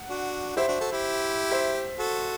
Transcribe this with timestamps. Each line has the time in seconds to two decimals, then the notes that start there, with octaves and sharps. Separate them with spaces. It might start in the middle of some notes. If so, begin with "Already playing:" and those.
Already playing: F#5
0.09 D4 F#4
0.57 E4 G4 C5 E5
0.68 D4 F#4
0.80 F#4 A4
0.92 E4 G4
1.51 C5 E5
1.99 F#4 A4